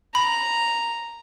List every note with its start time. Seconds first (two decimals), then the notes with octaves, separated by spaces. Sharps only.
0.15 A#5 B5